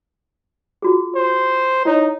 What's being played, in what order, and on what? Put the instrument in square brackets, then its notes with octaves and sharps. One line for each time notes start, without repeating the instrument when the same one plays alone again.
[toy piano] F4 F#4 G#4
[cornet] C5
[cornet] D#4 [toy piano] E4 C#5